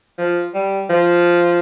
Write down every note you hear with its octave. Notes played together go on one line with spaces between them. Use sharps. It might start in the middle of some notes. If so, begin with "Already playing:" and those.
F3
G3
F3